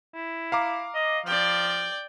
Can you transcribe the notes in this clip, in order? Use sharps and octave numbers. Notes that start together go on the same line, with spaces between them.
E4
F5 A#5 D6
D#5
F3 D5 G5